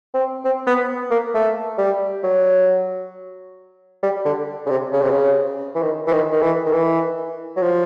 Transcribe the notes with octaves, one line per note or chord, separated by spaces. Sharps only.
C4
C4
B3
A#3
A3
G3
F#3
G3
D3
C#3
C3
C#3
C3
C#3
E3
D#3
E3
D#3
D#3
E3
D#3
E3
F#3
F3